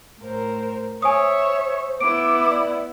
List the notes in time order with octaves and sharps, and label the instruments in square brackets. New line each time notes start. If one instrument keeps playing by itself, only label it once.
[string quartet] A2 A#4 C5
[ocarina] C5 [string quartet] C#5 E5 [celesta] G#5 D#6
[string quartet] B3 E4 [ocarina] D6 [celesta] D7
[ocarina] D5